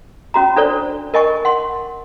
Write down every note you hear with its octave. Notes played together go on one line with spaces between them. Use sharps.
C#4 F#4 A#5
D4 A4 C5 D5
A#4 D#5 G#5 C#6
F#5 C6